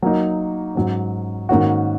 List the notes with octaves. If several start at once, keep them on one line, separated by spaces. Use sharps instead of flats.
F#3 A#3 D#4
G#2 F#3 C#4
G#2 D#3 A#3 C#4 F#4